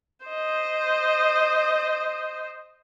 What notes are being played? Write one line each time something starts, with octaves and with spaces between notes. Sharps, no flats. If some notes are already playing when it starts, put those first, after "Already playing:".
C5 D#5